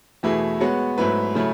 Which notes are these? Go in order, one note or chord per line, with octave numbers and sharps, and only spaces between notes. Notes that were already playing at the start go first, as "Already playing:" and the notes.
E2 B2 A3 E4 G#4
G#3 B3 F#4 C#5
G#2 F#3 A3 E4 B4
C#3 F#3 A3 E4